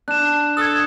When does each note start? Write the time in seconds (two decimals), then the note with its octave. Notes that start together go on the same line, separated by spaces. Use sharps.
0.08 D4 F#6 E7
0.57 A4 D#6 G#6